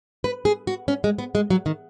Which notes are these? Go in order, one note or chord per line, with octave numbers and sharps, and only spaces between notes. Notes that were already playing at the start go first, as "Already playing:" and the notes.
B4
G#4
F#4
C#4
G#3
B3
G#3
F#3
D#3